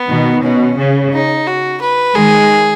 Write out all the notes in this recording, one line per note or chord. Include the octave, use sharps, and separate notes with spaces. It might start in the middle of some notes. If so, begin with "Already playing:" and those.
Already playing: B3
B2 D#3
B2 C#4
C#3
D#4
F#4
B4
D#3 G#3 G#4